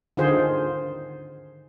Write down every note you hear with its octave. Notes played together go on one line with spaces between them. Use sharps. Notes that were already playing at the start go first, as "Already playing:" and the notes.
D3 D#3 F4 G#4 C5